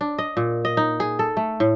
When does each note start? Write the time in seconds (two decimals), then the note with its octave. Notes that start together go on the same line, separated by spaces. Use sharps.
0.01 D4
0.18 D#5
0.37 A#2
0.65 D#5
0.77 D#4
1.00 G#4
1.19 A4
1.37 A3
1.60 A2